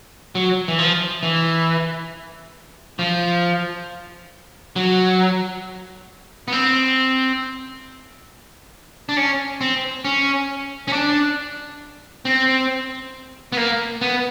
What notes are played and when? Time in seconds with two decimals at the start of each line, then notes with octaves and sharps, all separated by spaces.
0.35 F#3
0.68 E3
0.79 F3
1.23 E3
2.99 F3
4.76 F#3
6.48 B3
6.52 C4
9.09 D4
9.17 C#4
9.61 C4
10.05 C#4
10.88 C#4
10.93 D4
12.25 C4
13.52 B3
13.57 A#3
14.01 B3